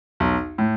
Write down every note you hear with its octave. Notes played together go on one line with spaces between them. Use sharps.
B1
A2